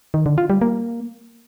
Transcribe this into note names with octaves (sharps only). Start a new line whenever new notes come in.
D#3
D3
F4
G3
A#3